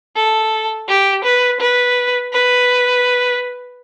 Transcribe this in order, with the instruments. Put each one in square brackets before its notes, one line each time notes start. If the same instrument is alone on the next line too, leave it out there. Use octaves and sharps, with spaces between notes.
[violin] A4
G4
B4
B4
B4